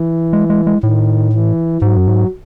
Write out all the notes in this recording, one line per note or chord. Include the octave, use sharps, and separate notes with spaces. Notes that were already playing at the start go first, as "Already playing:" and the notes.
Already playing: E3
G#3
G#3
G#3
A2 D#3
E3
G#2 F#3
F#2
G#2